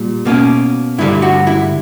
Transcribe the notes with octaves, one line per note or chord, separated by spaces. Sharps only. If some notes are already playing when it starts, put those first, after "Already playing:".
Already playing: A#2 G3
B2 A#3 C#4
G2 D3 G3 E4
F#4
E4